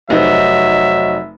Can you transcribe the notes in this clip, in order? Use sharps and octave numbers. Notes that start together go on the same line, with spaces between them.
F1 F#3 C4 D#4 D#5 E5